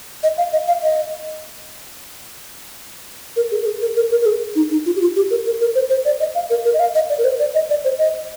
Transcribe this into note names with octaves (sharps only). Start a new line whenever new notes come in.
D#5
F5
D#5
F5
D#5
A#4
G#4
A#4
G#4
A#4
A#4
A#4
A#4
G#4
D#4
D#4
F4
G4
F4
G4
A#4
A#4
A#4
C5
C5
D5
D#5
F5
A#4
A#4
D#5
F5
D#5
D5
A#4
C5
D5
D#5
D5
C5
D#5